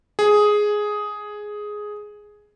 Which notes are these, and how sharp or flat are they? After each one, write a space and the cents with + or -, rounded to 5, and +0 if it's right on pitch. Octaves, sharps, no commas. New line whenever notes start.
G#4 +5